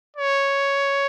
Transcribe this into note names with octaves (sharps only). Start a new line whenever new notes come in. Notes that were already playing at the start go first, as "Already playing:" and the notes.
C#5